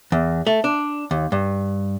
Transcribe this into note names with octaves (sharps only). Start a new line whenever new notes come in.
E2
A3
D4
D#2
G2